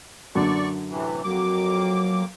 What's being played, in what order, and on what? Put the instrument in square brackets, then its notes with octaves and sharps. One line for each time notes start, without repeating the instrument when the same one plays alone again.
[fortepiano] F#2 D3 [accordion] D5 C#6
[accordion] A2 C3 E3
[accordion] F2 A#3 D6 [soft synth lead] F#3